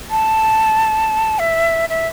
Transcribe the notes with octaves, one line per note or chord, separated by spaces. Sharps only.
A5
E5
E5